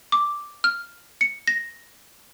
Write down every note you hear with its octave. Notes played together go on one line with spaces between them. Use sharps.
D6
F6
C#7
A#6